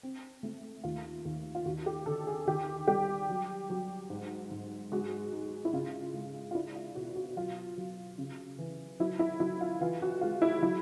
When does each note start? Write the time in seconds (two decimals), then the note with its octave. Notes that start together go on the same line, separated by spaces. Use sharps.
0.03 C4
0.43 A3
0.84 D#2 F4
1.25 D#2
1.55 F4
1.65 D#2 F#4
1.86 G4
2.06 D3 A4
2.27 G#4
2.47 D#3 G4
2.88 G3 G4
3.29 F#3
3.70 F#3
4.10 G#2
4.51 G#2
4.92 G#3 F#4
5.32 D#4
5.65 E4
5.73 C#3 F4
6.14 G#3
6.51 F4
6.55 D4 E4
6.75 F4
6.95 B2 F#4
7.16 F#4
7.36 F#3 F4
7.78 F#3
8.18 C#3
8.59 E3
9.00 F#3 E4
9.19 E4
9.40 F#3 E4
9.61 F4
9.81 E3 F4
10.02 F#4
10.21 G#3 F4
10.42 E4
10.62 F#3 E4